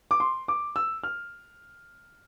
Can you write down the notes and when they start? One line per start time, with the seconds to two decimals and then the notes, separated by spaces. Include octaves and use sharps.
0.11 D6
0.20 C6
0.48 D6
0.76 E6
1.04 F6